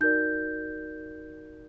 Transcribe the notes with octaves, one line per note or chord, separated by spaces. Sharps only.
D#4 F#4 A#4 D5 G6